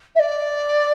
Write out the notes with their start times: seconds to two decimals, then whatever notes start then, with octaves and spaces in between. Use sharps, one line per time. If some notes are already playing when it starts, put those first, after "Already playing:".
0.15 E5
0.19 D5